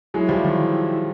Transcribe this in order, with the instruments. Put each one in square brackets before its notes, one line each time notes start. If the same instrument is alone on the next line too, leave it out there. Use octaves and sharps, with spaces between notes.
[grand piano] F#3 G#3 [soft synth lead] E4
[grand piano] F3 G3
D#3 F3